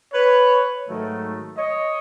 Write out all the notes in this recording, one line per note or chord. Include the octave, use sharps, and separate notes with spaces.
B4 C#5
G#2 D#3 F#3 A3
C#5 D#5